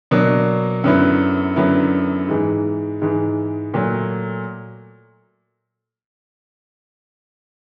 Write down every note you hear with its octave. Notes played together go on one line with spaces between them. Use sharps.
B2 F#3 A#3 D4
F#2 D3 F#3 B3 E4
F#2 D3 F#3 B3 E4
G#2 E3 G#3
G#2 E3 G#3
A#2 F#3 A3